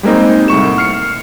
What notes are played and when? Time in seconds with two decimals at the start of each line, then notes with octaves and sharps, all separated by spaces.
0.03 G3 G#3 A#3 C4 D#4
0.48 C2 A2 C#6 E7
0.78 F6 C7 C#7